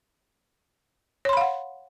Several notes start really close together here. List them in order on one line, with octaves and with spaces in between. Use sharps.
C#5 C6 B5 F5 F#5